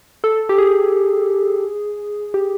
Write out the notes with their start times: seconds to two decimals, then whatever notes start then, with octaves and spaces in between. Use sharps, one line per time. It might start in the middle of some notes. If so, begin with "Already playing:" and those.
0.24 A4
0.49 G4
0.58 G#4
2.34 G4